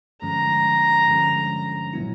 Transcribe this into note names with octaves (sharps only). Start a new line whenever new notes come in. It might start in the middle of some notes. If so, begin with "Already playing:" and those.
G2 D3 F3 G#3 C#4 A#5
G2 D3 F3 G#3 C#4
A#2 F#3 B3 E4